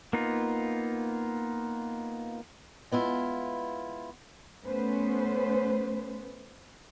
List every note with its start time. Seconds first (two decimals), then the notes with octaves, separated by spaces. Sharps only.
0.13 A#3 B3 D#4 F4
2.91 G#3 B3 E4 F4
4.65 A3 B3 C#4 B4 C5